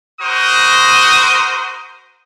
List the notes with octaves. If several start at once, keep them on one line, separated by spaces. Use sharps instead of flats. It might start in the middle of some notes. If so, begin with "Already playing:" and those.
F#4 A#4 C5 D#6